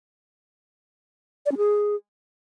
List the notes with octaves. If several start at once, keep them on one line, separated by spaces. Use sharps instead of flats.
D5
C#4
G#4